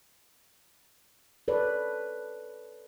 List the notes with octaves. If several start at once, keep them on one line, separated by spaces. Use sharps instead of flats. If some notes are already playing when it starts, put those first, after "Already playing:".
A4 B4 C#5 D5